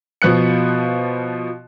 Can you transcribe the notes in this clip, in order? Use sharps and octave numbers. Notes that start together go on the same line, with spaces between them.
B2 F3 B3 F#6 C#7